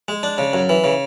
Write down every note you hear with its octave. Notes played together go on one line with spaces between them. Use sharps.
G#3
D4
C#3
F#2
E3
C#3